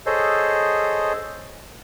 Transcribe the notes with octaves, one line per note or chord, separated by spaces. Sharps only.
G#4 A4 C5 C#5 D#5